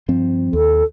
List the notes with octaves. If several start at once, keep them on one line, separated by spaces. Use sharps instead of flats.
G2 F3 C4
D#2 A4